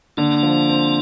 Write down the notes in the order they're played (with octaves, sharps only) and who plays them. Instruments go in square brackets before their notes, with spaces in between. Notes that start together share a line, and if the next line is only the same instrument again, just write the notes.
[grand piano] D3 [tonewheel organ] A#3 D4
[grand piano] F3
C4